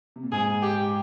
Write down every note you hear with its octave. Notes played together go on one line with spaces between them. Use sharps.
C3
A#2
G#2 G#4
G4